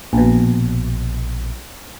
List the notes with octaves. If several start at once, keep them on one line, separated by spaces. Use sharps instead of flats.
A#1 B2